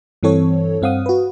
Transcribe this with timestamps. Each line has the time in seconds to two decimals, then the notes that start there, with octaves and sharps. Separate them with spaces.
0.23 G2 E3 C4 A4 C#5
0.82 G2 C4 F5 F#5 D#6
1.06 F#4 B4